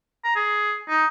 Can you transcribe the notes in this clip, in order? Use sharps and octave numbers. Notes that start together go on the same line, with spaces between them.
A#5
G#4
D#4